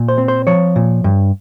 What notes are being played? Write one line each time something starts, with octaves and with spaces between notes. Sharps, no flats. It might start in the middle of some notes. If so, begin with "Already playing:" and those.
Already playing: A#2
C5
C4
C5
F3 C#5
A#2
G2